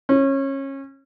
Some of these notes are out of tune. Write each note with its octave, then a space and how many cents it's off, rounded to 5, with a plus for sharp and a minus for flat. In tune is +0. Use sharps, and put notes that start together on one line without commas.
C#4 -25